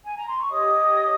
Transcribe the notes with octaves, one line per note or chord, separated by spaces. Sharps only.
G#5
A#5
C6
C#6
G4 C#5 D#5 D#6